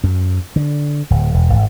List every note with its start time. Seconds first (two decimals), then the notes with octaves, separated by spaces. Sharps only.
0.04 F#2
0.56 D3
1.10 D1
1.34 E1
1.53 G#1